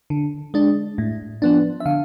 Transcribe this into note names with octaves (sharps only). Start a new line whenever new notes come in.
D3
G#3 D4
A2
F3 B3 D4
E5
D3 F5